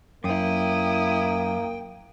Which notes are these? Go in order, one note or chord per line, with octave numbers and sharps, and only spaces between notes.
F#2 A#3 E4 G5 D#6